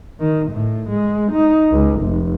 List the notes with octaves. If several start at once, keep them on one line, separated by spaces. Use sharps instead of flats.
D#3
A2
G#3
D#4
C#2
F1